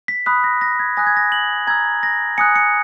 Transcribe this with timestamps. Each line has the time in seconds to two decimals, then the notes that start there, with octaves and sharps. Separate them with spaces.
0.08 B6
0.26 B5 D#6 F#6 B6
0.44 A#6
0.61 A#6
0.79 G#6
0.97 G#5 D#6 F#6 A#6
1.07 G#6
1.17 A#6
1.32 F#7
1.67 A#5 E6 G#6
2.03 A#6
2.38 G#5 D#6 F#6 C#7
2.56 C#7